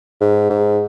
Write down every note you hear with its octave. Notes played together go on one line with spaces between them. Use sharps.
G#2
G#2